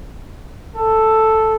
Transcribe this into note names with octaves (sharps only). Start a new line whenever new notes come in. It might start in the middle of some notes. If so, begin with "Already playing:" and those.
A4